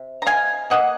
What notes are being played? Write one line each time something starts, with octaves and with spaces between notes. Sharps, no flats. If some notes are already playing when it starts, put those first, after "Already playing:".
Already playing: C3
A#5
G#3 F5 G#5
A#3 D#5 F#5